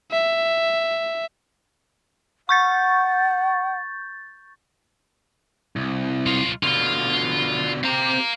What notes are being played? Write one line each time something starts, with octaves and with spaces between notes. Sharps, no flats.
E5
F#5 C#6 G6 A6
C2
B1 F4
B2 D3 F4 F5
C4 G4 F5 A#5